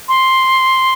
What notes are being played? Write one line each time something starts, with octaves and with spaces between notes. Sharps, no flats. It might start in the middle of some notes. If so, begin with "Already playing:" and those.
C6